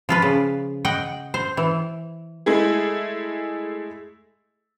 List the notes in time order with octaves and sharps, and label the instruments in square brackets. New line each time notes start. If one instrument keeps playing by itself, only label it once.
[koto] F3 F4 B4
C#3
D#5 F#5 G5
C5
E3
[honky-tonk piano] G#3 A3 E4 G#4